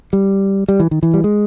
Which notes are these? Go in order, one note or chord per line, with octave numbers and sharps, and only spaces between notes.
G3
G3
E3
D#3
E3
G3
G#3